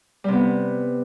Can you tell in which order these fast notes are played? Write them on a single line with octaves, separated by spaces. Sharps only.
G3 C3 B3